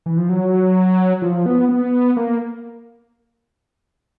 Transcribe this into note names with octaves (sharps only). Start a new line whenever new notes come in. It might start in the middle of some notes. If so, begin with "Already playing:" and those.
E3
F3
F#3
F3
B3
B3
A#3